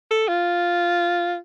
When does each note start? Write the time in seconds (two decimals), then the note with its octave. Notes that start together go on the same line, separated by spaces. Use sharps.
0.11 A4
0.28 F4